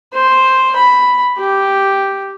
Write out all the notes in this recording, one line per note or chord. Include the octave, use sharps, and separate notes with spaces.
C5
B5
G4